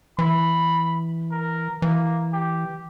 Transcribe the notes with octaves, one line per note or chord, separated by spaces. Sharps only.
E3 B5
A#4
E3 A#3
G4